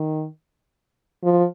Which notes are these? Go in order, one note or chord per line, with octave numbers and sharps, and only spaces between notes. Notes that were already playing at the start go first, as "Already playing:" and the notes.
Already playing: D#3
F3